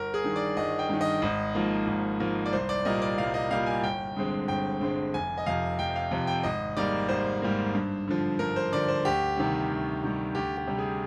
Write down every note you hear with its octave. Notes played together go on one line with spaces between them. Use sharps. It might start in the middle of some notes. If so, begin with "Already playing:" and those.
Already playing: G1 A#4
G#4
G2 D#3
D5
G1 D#5
G5
G2 D#3
D#5
G#1
G#2 F3 A#3
G#1
G#2 F3 A#3
D5
C2 C5
D5
A#2 G3 A#3 D#5
D5
C2 F5
D#5
A#2 G3 A#3 F5
G#5
G1 G5
G2 D3 G#3 C4
G1 G5
G2 D3 G#3 C4
F1 G#5
D#5
F2 C3 F5
F1 G5
F5
F2 C3
G5
G#1 D#5
G#2 G3 A#3 D5
G#1 C5
G#2 G3 A#3
G2
D3 F3
G2 A#4
C5
D3 F3 D5
C5
D2 G4
C3 D#3 G3
D2
C3 D#3 G3
D2 G4
G4
C3 G3
G#4